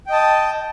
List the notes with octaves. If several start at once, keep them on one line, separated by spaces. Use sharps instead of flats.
D#5 G5 A5 D#6